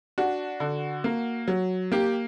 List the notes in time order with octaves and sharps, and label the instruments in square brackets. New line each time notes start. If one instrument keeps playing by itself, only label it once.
[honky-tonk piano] D4 F#4
D3
A#3
F#3
A#3 G4